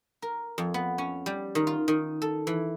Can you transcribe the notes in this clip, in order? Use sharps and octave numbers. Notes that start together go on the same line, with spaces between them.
A#4
F2
B3
C#4
G3
D#3
F4
D#3
A4
E3